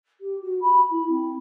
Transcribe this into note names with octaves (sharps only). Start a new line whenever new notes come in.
G4
F#4
B5
E4
C4